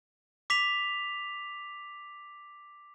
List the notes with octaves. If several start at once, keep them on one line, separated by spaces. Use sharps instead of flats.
D6 B6 F7